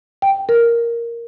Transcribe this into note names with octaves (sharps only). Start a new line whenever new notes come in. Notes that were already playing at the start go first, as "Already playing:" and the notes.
G5
A#4